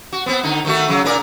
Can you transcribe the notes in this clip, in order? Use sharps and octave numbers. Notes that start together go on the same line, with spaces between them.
F#4
B3 C4
D3 D#4
D#3 A3 F#4
C#3 F#3
A#2 A#4 D5